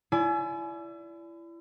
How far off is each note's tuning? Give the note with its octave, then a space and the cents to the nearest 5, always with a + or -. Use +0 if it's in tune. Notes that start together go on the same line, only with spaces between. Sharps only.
E4 +30 D5 -20 G#5 +30